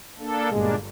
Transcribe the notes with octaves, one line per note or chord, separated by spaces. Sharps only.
A#3 D4 A4
G1 A#2 G#3 A#3 D4